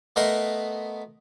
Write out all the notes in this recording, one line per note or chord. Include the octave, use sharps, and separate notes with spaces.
A3 B3 A#4 D#5 C6